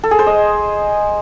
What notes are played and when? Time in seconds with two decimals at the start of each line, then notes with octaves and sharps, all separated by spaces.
0.03 A4
0.11 G#4
0.19 C5
0.26 D#5